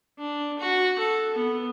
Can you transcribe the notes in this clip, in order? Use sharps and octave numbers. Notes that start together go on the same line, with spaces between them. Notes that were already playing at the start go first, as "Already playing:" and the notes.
D4
F#4
A4
B3